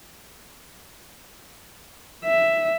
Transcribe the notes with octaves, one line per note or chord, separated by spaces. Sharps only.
E5